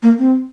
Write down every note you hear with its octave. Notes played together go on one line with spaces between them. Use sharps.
A#3
C4